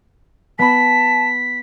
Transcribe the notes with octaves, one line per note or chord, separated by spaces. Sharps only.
B3 A5 B5 B6